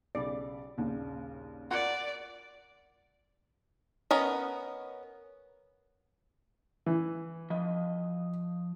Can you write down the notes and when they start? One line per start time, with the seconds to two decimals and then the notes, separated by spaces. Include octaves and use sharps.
0.15 B1 C#3 D5 B5
0.77 A#1 D#2 C#3
1.71 F4 A#4 D5 F#5
4.11 B3 C#4 A#4 D#5
6.86 E3
7.50 F3 D#5